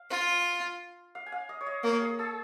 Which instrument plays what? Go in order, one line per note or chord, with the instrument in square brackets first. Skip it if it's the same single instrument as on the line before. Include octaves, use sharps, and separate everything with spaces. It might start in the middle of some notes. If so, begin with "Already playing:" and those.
Already playing: [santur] F5
[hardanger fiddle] F4
[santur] F5
G#5
F5
D#5
C#5
D#5
[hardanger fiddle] A#3 [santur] C#5
[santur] G#4
G#4